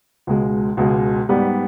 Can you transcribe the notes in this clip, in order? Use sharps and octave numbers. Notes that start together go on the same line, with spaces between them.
C#2 B2 G#3
C#2 B2 G#3
G#2 G3 B3 G4